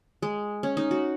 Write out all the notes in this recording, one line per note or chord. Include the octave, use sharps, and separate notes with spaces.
G#3
C#4
D#4
F#4